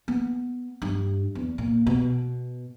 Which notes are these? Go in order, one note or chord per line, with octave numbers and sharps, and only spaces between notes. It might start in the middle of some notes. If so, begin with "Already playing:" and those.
B3
G2
E2
A#2
B2